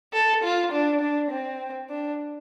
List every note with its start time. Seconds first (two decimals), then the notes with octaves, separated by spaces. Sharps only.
0.13 A4
0.44 F4
0.72 D4
1.01 D4
1.31 C4
1.90 D4